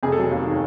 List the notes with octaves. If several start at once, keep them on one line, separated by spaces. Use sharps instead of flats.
F1 G#4
A4
F#3 G#4
D#2
D#3